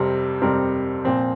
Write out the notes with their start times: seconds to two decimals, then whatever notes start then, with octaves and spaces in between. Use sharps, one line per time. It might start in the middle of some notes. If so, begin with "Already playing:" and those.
Already playing: F2 C3 G3 C4 A#4
0.41 F2 C3 G3 C4 A#4
1.05 A#2 F3 C4